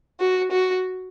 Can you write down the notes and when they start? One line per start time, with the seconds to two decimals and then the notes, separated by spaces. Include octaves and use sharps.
0.20 F#4
0.52 F#4